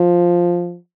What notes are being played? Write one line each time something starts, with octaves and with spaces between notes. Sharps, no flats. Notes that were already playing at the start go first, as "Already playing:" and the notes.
Already playing: F3